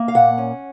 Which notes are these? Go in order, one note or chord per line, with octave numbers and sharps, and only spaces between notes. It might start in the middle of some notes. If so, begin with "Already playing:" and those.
Already playing: A#3
F5
A#2 F#5
C#4